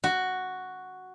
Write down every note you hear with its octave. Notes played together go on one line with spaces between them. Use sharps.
F#4